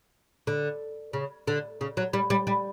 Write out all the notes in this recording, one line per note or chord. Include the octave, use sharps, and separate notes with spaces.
D3
C#3
D3
C#3
F#3
G3
G3
G3